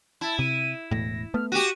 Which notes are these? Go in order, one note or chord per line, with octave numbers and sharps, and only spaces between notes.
E4 A5
C3 D#7
E1 A2 A#6
A3 B3 F6
F#4 G4 D#7